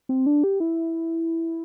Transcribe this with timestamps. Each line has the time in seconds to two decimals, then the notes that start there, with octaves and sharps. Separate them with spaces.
0.09 C4
0.26 D4
0.44 G4
0.60 E4